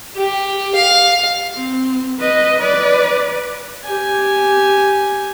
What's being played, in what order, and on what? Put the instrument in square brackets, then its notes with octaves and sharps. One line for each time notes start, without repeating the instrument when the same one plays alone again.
[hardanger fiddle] G4
F5
[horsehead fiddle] C4
B4 D#5
B4 D5
[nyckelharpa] G4 G#5